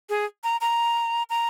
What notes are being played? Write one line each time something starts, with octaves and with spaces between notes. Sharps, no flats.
G#4
A#5
A#5
A#5